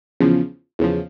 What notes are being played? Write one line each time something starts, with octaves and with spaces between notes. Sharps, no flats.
E2 C#3 F3
E2 C#3 F3